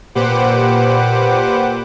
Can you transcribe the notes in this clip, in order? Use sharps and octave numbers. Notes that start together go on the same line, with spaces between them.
A#2 G4 B4 C5 F#5 D6